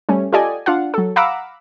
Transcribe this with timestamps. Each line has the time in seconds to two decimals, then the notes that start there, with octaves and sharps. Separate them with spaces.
0.09 G3 A3 C#4
0.32 F4 G4 A4 D5 D#5 G#5
0.66 D4 F4 F5 F#5
0.94 F#3 A4
1.16 F5 F#5 A#5 B5 D6 E6